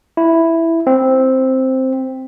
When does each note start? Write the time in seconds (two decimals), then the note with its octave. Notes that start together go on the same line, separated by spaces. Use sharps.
0.17 E4
0.87 C4